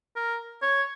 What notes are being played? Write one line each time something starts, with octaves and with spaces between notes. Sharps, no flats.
A#4
C#5